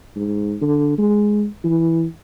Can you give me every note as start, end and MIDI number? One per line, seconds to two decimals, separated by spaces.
0.16 0.55 44
0.62 0.96 50
0.98 1.46 56
1.64 2.05 52